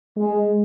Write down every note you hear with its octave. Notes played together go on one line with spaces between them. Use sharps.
G#3